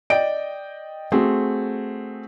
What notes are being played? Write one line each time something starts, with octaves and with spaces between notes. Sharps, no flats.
D5 D#5 G5 D7
A3 C4 F#4 G#4